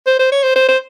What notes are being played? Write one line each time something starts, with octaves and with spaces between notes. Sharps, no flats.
C5
C5
C#5
C5
C5
C5